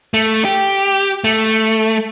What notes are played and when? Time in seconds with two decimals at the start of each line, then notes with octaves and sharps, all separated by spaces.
0.14 A3
0.45 G4
1.24 A3